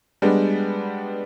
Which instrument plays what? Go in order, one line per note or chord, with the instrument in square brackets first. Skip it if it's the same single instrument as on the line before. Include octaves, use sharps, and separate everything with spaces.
[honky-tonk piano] G3 G#3 B3 D4